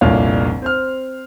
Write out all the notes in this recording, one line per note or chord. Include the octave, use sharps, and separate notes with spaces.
F1 C2 A#2 D4 C#5 F5
C4 C5 F6